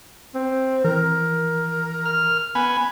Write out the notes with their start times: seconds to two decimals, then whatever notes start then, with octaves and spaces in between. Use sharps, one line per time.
0.35 C4
0.84 E3 A#4
2.05 F6
2.55 B3 G#5 B5